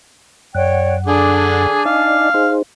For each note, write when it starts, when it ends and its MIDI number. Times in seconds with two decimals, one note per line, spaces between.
0.55 1.67 42
0.55 0.96 73
0.55 0.96 74
0.55 1.67 78
0.55 0.96 79
1.06 1.85 50
1.06 2.28 62
1.06 1.85 68
1.06 2.28 80
1.06 2.28 86
1.85 2.29 63
1.85 2.29 74
1.85 2.29 75
1.85 2.54 77
2.34 2.62 63
2.34 2.62 68
2.34 2.62 72